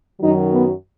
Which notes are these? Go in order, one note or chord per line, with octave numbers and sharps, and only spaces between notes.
F#2 D#3 F#3 D#4
B3